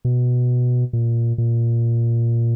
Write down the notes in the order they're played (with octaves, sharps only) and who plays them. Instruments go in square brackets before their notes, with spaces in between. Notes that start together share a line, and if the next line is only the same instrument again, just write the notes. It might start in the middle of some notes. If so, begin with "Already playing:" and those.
[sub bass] B2
A#2
A#2